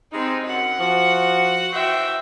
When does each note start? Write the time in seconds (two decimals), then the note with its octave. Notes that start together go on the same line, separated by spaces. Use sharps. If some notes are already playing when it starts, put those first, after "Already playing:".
0.13 G3 G#3 C4 D#4
0.46 F#2 F#5
0.79 F3 F#4
1.73 E3 F#4 C5 E5 G5